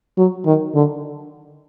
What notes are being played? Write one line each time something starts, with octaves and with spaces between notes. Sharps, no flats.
F#3
D#3
D3